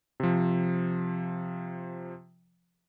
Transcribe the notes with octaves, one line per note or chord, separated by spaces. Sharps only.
C3 F3